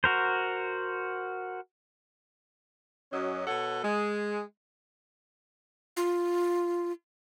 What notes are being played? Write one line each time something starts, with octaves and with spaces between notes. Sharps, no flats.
F#4 A#4 C5
F#2 F#3 C#4 D#5
B2 A4 C#5 F#5
G#3
F4